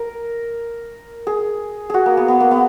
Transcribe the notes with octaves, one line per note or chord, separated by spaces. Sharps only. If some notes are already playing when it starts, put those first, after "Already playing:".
Already playing: A#4
G#4
F#4 G#4
A#3
B3
B3
A#3
B3